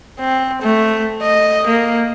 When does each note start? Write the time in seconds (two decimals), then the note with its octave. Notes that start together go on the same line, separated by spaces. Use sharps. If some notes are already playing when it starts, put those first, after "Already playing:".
0.20 C4
0.62 A3
1.22 D#5
1.67 A#3